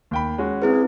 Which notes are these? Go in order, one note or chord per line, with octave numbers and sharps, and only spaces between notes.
D#2 G5 B5
G#3 C#4 F#4
C4 E4 G#4 B4